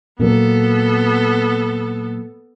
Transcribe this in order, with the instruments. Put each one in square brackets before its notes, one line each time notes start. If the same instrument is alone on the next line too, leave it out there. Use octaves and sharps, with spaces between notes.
[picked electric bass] A#2 F#3 [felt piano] A#3 [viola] B3 A4